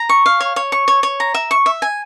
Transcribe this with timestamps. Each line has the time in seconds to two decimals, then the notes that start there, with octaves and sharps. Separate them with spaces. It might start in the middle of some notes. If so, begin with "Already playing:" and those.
Already playing: A#5
0.09 C#6
0.26 F5
0.40 C#5
0.56 C#5
0.72 C#6
0.88 C#5
1.03 C#5
1.20 A#5
1.34 E5
1.51 C#6
1.66 E5
1.82 G#5